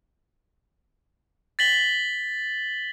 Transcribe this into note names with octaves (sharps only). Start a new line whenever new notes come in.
A6 B6 F#7 G7